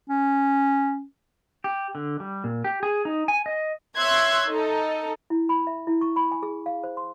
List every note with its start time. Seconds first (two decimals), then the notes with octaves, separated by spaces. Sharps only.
0.10 C#4
1.64 G4
1.95 D3
2.20 G3
2.44 A#2
2.64 G4
2.83 G#4
3.05 D#4
3.28 G#5
3.46 D#5
3.97 C#5 E5 C6 E6 F#6 G#6
4.48 D#4 A4
5.30 E4
5.49 B5
5.67 E5
5.87 E4
6.01 C#6
6.16 B5
6.32 G#5
6.43 G#4
6.66 F5
6.84 C5
6.97 C6